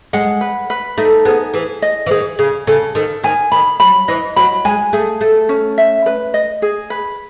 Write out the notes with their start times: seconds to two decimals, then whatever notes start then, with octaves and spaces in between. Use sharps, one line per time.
0.13 G#3 F#5
0.41 B4
0.70 B4
0.98 A3 D#4
1.25 B3 G#4
1.54 E3 G#4
1.82 D#5
2.06 E3
2.11 D#3 G#4
2.39 C#3 G#4
2.67 C#3 A4
2.95 D#3 A4
3.23 D#3 G#5
3.52 D#3 B5
3.80 F#3 B5
4.08 E3 D#5
4.36 F#3 B5
4.65 G#3 G#5
4.93 A3 G#4
5.21 A3 A4
5.49 C#4
5.78 E5
6.06 B4
6.34 D#5
6.62 G#4
6.90 B4